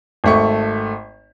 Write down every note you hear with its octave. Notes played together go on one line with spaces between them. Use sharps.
G#1 A3 C#6